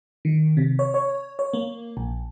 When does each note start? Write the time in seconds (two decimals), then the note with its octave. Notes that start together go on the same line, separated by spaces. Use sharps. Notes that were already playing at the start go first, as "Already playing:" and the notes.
0.25 D#3
0.57 C3
0.79 C#5
0.94 C#5
1.39 C#5
1.53 A#3
1.97 A#1